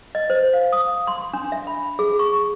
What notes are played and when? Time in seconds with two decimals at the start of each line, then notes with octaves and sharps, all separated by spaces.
0.15 D#5
0.30 C5
0.53 F5
0.72 D#6
1.07 C6
1.34 D4
1.52 E5
1.67 B5
1.99 G#4
2.19 C#6